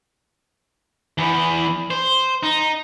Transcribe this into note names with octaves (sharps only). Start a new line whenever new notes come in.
E2 E3
C5
D#4